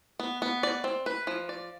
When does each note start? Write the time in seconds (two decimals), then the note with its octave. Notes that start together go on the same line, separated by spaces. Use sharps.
0.20 B3
0.42 B3
0.63 D5
0.84 C4
1.06 B4
1.27 F3
1.49 D5